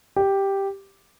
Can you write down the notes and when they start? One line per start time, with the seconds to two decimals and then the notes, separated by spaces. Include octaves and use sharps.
0.16 G4